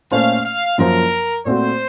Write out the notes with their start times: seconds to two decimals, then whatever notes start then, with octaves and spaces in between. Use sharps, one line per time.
0.11 A#2 A3 C#4 A4 C5 F5
0.45 F5
0.78 F#2 F3 A#3 F4 A#4 C5
1.45 A#2 A3 C4 F#4 C5